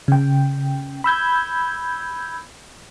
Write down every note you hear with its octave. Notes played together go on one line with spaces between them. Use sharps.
C#3 G5
B5 E6 G6 G#6